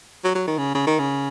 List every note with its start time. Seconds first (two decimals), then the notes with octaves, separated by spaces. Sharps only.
0.24 F#3
0.35 F#3
0.47 D#3
0.58 C#3
0.75 C#3
0.87 D#3
0.99 C#3